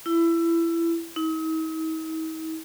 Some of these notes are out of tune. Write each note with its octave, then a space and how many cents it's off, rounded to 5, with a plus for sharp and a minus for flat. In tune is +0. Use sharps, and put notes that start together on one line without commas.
E4 +20
D#4 +45